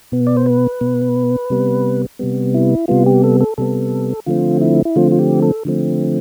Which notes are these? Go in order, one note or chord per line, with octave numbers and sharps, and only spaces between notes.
B2 B3
D5
C5
B4
B2 B3
C3 G3 B3
C3 G3 B3
E4
C3 G3 B3 F4
G4
A4
A4
C3 G3 B3 A4
D3 F3 A3 C4 F4
E4
E4
D3 F3 A3 C4 F4
F4
G4
A4
D3 F3 A3 C4